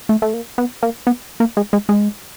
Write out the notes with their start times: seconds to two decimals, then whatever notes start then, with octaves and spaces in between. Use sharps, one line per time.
0.09 A3
0.22 A3
0.34 A#3
0.58 B3
0.83 A#3
1.07 B3
1.40 A#3
1.57 G#3
1.73 G#3
1.89 G#3